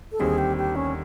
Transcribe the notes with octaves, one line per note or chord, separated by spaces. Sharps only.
A4
D#2 D3 G3 C4 D#4 G#4
G4
G4
C#4